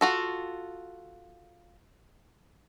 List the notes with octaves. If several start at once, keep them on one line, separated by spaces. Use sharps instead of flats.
F4 F#4 A4